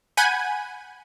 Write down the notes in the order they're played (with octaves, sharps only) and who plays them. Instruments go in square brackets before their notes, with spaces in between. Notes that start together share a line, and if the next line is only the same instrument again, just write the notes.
[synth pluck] F#5 G#5 B5 G6 D#7